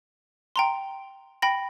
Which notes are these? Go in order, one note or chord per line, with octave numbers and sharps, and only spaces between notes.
G5 A#5 C6
G5 B5 A#6